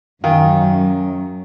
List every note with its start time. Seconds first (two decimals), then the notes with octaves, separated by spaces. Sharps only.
0.24 F#2 D#3 F5 G#5